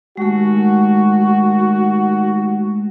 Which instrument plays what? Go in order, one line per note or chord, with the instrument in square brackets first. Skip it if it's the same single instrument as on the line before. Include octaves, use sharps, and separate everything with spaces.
[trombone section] D#2 F#4 [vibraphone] G#3 A3